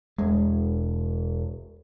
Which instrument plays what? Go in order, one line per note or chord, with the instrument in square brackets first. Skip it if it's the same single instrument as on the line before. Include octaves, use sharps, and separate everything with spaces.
[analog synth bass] E1 [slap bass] G#3